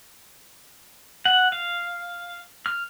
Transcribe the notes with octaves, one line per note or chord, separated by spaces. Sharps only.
F#5
F5
F6